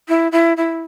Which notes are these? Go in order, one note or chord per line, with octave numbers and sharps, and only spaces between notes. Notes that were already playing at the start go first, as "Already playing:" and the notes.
E4
E4
E4